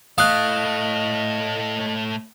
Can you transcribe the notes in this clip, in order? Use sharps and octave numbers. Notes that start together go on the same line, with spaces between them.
A2 A3 D#5 F5 D#6 F#6